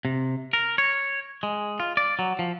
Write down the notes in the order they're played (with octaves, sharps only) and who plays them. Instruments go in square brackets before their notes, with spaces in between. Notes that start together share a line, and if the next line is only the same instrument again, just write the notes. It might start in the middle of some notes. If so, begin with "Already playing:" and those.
[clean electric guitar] C3
A#4
C#5
G#3
F4
D5
F#3
F3